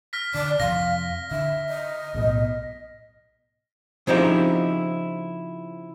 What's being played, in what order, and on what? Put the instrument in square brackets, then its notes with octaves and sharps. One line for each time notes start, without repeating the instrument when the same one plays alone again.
[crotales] F6 A#6 B6
[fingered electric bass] D3 [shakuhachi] D5
[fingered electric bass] F2 C3 [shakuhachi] F5 [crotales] A#6
[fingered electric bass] D3 [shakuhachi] E5
[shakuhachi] D#5
[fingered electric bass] B1 A2 B3
[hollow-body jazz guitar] C#3 F3 C4 D#4 E4 G4